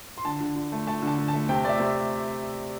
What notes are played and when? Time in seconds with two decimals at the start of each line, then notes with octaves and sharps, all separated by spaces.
0.18 C6
0.25 D3 A5
0.41 D3
0.56 D3
0.72 A3
0.87 A3 A5
1.03 D3 A5
1.18 D3
1.28 A5
1.33 A3
1.49 C3 G5
1.65 A3 D5 E5
1.80 C3